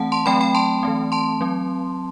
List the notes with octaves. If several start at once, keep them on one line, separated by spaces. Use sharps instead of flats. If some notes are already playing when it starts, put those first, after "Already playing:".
Already playing: E3 A3 C4 F#5 A5
A5 C6
F#3 A3 C4 G5 B5
G5 B5
A5 C6
E3 A3 C4
A5 C6
F#3 C4